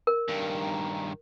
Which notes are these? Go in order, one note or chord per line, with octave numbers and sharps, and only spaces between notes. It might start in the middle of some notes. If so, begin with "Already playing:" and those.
A#4
G2 D#3